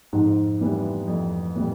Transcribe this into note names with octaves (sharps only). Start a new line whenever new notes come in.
F2 G#2
C3 E3 G3 B3
F2
C3 E3 G3 B3